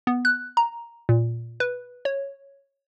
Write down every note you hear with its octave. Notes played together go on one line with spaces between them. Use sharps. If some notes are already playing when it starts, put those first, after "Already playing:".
B3
F#6
A#5
A#2
B4
C#5